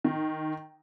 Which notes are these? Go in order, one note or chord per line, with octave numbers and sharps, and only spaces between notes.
D#3